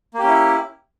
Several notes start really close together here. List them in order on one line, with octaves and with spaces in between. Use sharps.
A#3 G4 C#4 E4